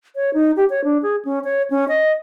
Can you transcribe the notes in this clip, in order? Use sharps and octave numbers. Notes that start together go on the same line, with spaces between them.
C#5
D#4
G4
C#5
D4
G#4
C#4
C#5
C#4
D#5